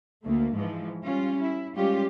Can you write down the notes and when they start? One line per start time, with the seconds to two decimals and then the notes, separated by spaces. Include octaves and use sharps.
0.23 D2 A3 A#3
0.55 G#2 E3 F3
1.03 G3 C#4 F4
1.41 E4
1.75 G3 G#3 C#4 F4 G4